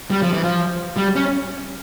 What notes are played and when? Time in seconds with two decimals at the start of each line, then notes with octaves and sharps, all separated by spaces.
0.10 G3
0.22 F3
0.33 E3
0.44 F3
0.97 G3
1.16 C#4